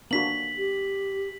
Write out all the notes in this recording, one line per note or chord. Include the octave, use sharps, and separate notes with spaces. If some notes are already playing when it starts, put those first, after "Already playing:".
A#3 D4 F#4 B6 F#7
G4